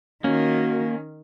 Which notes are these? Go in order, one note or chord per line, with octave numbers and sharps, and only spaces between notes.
D#3 A#3 C#4 F#4